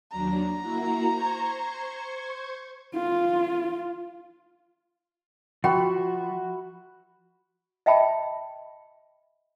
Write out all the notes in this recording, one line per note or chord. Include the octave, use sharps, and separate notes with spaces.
D#2 F#3 D4 A#5
A#3 E4 F#4
C5 C#6 G#6
F4
F3 F#4 E5 G5 B5
D#5 E5 G5 A5 B5 C#6